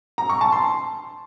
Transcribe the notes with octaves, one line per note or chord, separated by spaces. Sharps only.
A#5
C#6
A5
C6